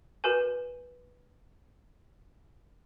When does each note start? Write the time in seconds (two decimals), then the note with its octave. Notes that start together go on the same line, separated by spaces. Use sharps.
0.24 F#4 A#4 B4 G#5